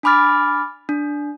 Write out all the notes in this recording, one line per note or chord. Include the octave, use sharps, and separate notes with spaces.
D4 G#5 B5 D6 F6 A6
D4